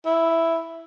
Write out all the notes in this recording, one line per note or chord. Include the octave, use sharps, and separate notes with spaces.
E4